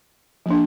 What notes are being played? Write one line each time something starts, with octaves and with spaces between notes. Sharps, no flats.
F3 A#3 D4